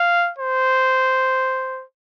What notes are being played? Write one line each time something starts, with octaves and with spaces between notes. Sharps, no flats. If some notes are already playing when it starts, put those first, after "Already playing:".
Already playing: F5
C5